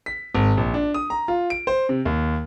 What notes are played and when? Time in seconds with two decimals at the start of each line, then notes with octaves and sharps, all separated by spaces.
0.06 B6
0.35 G#1
0.57 A#1
0.74 D4
0.94 D#6
1.10 A#5
1.28 F4
1.50 D7
1.67 C5
1.89 C3
2.05 D#2